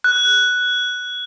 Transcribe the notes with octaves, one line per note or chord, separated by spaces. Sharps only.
F#6